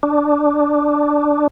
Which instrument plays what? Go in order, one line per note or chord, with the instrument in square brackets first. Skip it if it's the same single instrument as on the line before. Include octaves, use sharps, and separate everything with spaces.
[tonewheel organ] D4